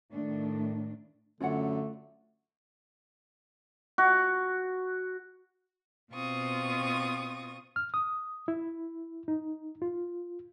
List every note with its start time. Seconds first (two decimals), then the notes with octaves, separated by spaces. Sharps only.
0.11 A2 D#3 A3 D4
1.40 F#2 D3 A3 F4 C#5 F#5
3.98 F#4
6.12 B2 C4 F4 C#6 D#6
7.76 F6
7.94 D#6
8.48 E4
9.28 D#4
9.82 F4